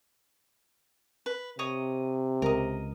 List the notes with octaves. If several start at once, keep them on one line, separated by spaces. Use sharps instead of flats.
B4
C3 C#5 D#5 D#6
C#2 A#4 D#5